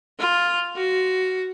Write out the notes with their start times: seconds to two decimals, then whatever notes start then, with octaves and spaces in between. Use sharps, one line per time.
0.19 F4
0.76 F#4